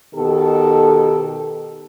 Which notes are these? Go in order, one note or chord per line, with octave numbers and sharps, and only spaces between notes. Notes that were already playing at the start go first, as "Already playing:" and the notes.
B2 D#3 G4 A4